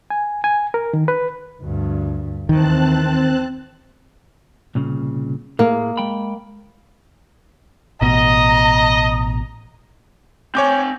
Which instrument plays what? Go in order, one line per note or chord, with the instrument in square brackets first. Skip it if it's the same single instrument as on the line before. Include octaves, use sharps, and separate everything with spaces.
[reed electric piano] G#5
G#5
A#4
D#3
B4
[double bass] D2 G2
[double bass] D#2 E3 [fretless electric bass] D#3 [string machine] C4 A5 F#6
[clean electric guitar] C2 A#2 C#3
[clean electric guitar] A2 A3 G#4 [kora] A#3
[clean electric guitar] G#3 G5 B5
[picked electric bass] A1 B2 [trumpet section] D#5 [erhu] A#5
[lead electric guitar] C4 G#5 [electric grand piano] C#5 D6 G6